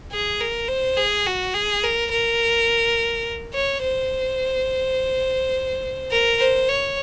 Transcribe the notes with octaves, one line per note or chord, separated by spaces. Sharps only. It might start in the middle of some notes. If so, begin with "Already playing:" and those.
G#4
A#4
C5
G#4
F#4
G#4
A#4
A#4
C#5
C5
A#4
C5
C#5